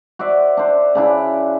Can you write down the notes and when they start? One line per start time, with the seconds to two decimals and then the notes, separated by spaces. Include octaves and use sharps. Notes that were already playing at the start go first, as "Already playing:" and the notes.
0.19 F#4 C5 D5 E5
0.57 D4 C5
0.95 C#3 D4 E4